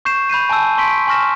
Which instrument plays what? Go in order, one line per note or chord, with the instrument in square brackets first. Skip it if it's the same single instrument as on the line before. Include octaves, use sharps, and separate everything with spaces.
[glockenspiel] C#6 G6 C7 E7
B5 G6 C7 D#7
G#5 A5 B5 E6
C6 C#6 B6 D7
G#5 C6 C#6 F6 A#6 E7